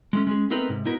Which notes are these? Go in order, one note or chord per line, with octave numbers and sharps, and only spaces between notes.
G#3 A3 C#4
G#3 C#4 G#4
A3 B3 C4 D#4 A#4 B4
G#2 C3
B3 D#4 E4 F#4 A#4 B4